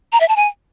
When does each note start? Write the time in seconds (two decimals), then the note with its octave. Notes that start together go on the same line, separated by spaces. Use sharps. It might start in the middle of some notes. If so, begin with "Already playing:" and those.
0.12 A#5
0.20 E5
0.28 A5
0.36 G#5